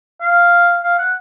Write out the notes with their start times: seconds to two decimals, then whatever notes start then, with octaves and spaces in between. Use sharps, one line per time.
0.21 F5
0.83 F5
0.99 F#5